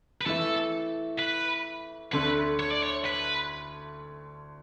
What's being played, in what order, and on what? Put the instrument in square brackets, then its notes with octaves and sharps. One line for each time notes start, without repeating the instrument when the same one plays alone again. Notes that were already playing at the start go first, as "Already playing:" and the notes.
[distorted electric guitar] B4
[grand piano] E3 A3 E4 [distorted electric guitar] A4
[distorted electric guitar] B4
[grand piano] D2 D3 A3 D4 A4 [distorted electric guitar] B4
[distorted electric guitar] C#5
D5
C#5
B4